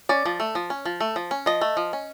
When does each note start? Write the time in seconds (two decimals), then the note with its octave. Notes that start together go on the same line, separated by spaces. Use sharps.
0.09 C#4 D5
0.26 F3
0.40 A3
0.55 F3
0.70 C#4
0.85 F3
1.01 A3
1.16 F3
1.31 C#4
1.46 F3 D#5
1.61 A3
1.77 F3
1.93 C#4